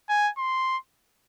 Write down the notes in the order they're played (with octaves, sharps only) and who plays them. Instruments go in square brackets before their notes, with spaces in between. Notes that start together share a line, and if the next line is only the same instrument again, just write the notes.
[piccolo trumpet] G#5
C6